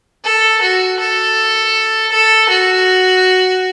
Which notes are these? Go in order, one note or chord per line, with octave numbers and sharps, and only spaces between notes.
A4
F#4
A4
A4
F#4